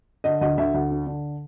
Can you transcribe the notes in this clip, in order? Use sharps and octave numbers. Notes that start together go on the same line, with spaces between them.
D3 D#5
D2 D#5
D2 E5
D2
D3
D3